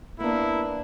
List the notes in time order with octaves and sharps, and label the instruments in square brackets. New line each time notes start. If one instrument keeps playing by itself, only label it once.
[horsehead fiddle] A#3 [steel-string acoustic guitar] B3 D4 [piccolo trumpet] E4